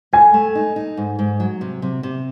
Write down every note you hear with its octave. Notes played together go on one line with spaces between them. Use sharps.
A3 G#5
A3
D#4
D#4
G#2
G#2
F#3
C3
C3
C3